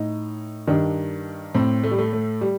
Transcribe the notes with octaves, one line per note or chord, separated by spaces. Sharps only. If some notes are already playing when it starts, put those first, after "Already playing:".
Already playing: A2 D#4
G2 D#3 D4
A2 C4
A3
G3
A3
A3
G3